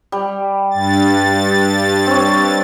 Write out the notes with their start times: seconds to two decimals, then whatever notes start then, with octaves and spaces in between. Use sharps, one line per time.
0.12 G3
0.70 G2 A6
2.07 C4 C#5